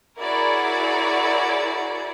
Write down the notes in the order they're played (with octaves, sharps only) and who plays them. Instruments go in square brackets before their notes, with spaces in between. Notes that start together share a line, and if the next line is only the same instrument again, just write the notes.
[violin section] E4 F#4 G#4 A#4 C#5 D5